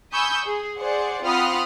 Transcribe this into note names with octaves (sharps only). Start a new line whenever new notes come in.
G#5 B5 C#6 D#6 E6 G6
G#4
G#4 C5 D5 F#5
C4 F4 F#5 B5 D#6 F6